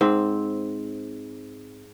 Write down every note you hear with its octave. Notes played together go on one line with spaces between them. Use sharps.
G#2 C4